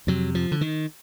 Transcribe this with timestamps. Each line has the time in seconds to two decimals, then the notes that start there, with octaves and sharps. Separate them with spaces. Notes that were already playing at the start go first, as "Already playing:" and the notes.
0.07 F2 C3 F#3
0.35 F3
0.52 D3
0.61 D#3